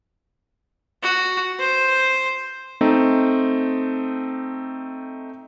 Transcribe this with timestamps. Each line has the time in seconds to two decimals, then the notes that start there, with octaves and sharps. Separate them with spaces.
1.03 F#4
1.59 C5
2.81 A3 C4 D#4